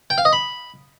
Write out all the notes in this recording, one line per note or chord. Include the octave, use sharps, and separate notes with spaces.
G5
F5
D#5
B5